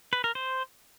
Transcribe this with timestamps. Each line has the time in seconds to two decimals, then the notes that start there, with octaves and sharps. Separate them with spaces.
0.13 B4
0.24 A#4
0.35 C5